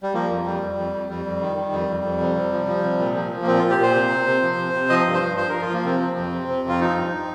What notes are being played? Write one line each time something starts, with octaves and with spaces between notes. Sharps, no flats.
G3
F3 A#3
F2
F2 G3
F2
F2
F2
F2 G3
F2
D#3
D#3
F2
F2
F2
C3
C3
F3
F3
C3
A#2
F3
F3
A#3
A#2 C4
A#2 F4
G4
A#2 C5
C3
C3
C3
F3
C3
C3
F3 D#5
G2
C5
F3
F3 C5
F3 A#4
F4
F3 A#3
C3 C4
F3
F2
C3
C3
F2 F4
F3 D#4
G2